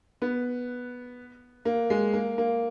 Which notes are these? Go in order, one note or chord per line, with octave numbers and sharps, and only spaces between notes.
B3
A#3
G#3
A#3
A#3